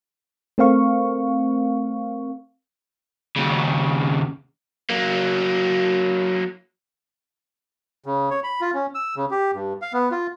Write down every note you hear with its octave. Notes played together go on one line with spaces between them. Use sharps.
A3 C4 A#4 F5 C#6
D#2 C#3
F#3 A#3
C#3
C#5
B5
F4
C#4
E6
C#3
G4
G2
F5
B3
F4